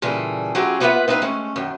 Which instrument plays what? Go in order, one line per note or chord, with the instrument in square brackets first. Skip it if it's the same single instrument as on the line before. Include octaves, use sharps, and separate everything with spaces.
[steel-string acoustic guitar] A#2 C#3 E3 G3 G#4 A4
F#3 A3 C#4 F4 G4 G#4
A#3 B3 F4 B4 E5 F#5
C4 D#4 E4 B4 F5
G#3 A3 C#4
F#2 D#3